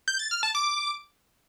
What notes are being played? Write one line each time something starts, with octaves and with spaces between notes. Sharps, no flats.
G6
A6
F6
A5
D6